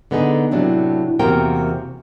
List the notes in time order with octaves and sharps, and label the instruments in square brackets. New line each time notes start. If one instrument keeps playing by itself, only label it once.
[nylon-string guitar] D3 B3 D#4 G#4
A2 C3 F#3 D4
E2 C3 A#3 F#4 A#4 G5